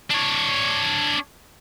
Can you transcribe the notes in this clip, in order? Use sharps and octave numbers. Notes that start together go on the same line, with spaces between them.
D4 C#5